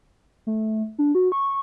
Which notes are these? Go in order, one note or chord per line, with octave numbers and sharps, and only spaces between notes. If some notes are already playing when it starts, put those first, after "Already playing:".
A3
D4
F#4
C#6